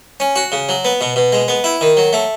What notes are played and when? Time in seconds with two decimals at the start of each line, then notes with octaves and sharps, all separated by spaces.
0.20 C#4
0.36 F#4
0.52 C#3
0.69 F#3
0.85 B3
1.01 B2
1.16 B2
1.32 G#3
1.48 B3
1.64 E4
1.81 D#3
1.97 F#3
2.13 A3